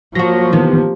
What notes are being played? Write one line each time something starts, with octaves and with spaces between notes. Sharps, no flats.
F3 F#3 A#3 F#4 A#6
C3 D#3 E3 B3